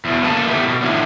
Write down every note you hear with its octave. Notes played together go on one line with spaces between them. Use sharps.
E2 B2
C#3 A#3 A4 D#5 A5
E3 A3 B3 D#4 G4
B2
A2 D#3 E3 F#3 D4